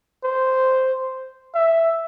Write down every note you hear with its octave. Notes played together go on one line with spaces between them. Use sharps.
C5
E5